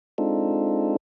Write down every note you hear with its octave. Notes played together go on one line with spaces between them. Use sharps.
G#3 C4 D4 D#4 F4 A4